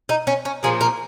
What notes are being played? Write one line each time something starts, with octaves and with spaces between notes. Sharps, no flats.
D#4
C#4
C#4
A#2 F3 A#3 G#4
A#4